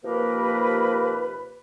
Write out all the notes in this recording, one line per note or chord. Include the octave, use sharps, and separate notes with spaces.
D#2 C3 F3 A#3 A#4 B4